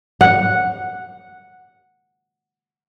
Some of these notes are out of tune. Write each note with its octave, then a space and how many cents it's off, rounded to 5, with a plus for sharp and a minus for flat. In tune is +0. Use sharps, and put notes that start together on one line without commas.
F#5 -5